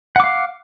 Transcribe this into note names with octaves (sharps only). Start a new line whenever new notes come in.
F5 F#5 D6